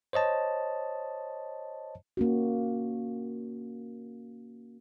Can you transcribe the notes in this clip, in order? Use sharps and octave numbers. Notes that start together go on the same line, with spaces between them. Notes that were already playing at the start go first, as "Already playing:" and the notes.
C5 C#5 D#5 A5
A#3 C#4 F#4